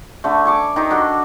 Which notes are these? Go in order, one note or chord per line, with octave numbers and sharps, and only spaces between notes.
D3 A3
G#5 C#6 D6
D#3 D#4 G4
D4 F#4 A4